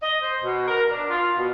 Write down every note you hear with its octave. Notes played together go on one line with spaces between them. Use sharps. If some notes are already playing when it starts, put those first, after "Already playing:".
D#5
C5
B2
A#4
D4
F4
B2